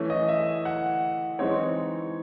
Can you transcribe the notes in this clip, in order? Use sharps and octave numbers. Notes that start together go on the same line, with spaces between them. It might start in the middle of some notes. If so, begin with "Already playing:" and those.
Already playing: E3 A3 C#4
D#5
E5
F#5
E3 G#3 C4 D#4 C#5